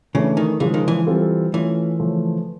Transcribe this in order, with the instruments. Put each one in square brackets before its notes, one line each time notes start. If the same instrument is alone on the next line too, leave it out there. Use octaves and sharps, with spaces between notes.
[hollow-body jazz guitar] C#3 [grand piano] E3 A3 D4
[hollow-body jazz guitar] D#3
[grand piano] C#3 F3 G#3 [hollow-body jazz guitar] E3
[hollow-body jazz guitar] D#3
E3
[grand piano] G3 C4 F4 A4
[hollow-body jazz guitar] E3 [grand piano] A3 C#4 F4
[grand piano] C#3 F3 A3 C#4